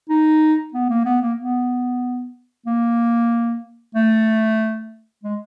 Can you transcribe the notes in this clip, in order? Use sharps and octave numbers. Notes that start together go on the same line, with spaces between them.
D#4
B3
A#3
B3
A#3
B3
A#3
A3
G#3